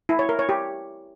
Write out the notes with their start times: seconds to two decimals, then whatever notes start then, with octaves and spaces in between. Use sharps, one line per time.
0.09 E4
0.19 C#5
0.29 A#4
0.39 C#5
0.49 G4